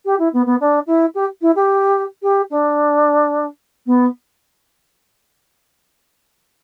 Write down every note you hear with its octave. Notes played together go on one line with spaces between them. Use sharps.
G4
E4
B3
B3
D4
E4
G4
E4
G4
G4
D4
B3